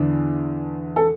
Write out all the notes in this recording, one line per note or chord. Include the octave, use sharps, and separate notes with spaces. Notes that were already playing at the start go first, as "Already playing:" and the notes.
Already playing: E2 D3 D4
A4